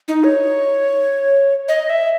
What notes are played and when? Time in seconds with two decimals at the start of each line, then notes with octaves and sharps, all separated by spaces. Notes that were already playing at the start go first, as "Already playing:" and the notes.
0.08 D#4
0.24 C#5
1.68 D#5
1.90 E5